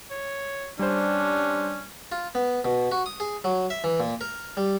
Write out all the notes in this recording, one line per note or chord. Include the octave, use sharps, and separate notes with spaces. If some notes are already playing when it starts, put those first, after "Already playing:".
C#5
G3 C#4 D4 C5
F4
B3
B2
F#4
D#6
G#4
F#3
E5
E3
A#2
A#4
G3